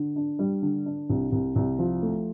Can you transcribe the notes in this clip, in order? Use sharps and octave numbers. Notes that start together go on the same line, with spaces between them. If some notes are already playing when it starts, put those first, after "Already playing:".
Already playing: D3
D4
G3
D3
D4
C2
C2
C2
F3
A3